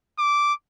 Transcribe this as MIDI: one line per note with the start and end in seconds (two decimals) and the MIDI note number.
0.19 0.53 86